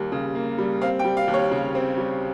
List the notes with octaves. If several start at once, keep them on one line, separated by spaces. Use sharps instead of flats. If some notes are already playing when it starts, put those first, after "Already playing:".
Already playing: D#2 G3 A#3
C#3
A#3
G3
C4 F5
G5
G3
F5
D#2
C#5
C#3
C4
G3